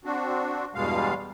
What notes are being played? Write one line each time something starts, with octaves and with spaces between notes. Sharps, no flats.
C4 D4 F#4
E2 G2 B2 G3 G#3 F5